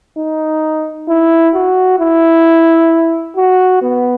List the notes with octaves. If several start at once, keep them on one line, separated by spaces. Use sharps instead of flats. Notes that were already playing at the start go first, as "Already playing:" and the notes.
D#4
E4
F#4
E4
F#4
B3